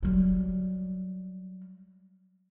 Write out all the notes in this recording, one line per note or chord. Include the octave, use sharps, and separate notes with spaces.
F#3 G3